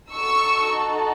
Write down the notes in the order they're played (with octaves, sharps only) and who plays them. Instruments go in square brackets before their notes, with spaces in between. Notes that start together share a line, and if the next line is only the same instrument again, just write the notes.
[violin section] D#4 F#4 A4 C#6 E6